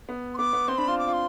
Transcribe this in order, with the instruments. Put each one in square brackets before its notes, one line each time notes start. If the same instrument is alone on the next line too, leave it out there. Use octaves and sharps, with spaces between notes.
[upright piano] B3
[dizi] C6
[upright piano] B3 [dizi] D6
[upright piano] B3
[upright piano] C4 [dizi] C6
[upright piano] D4 [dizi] B5
[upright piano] F4 [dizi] C6
[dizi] D6
[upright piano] F4
[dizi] C6